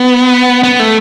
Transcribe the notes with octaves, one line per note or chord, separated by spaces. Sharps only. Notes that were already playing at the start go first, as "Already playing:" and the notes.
Already playing: B3
B3
A3